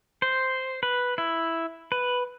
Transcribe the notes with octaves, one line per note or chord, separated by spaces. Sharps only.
C5
B4
E4
B4